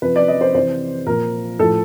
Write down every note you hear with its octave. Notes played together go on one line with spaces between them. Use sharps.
C3 F3 B4
D5
D#5
C5
C3 E3 C5
A#2 F3 A#4
A2 F3 A4